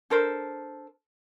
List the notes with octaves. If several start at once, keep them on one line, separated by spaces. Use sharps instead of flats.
D4 A4 A#4 C5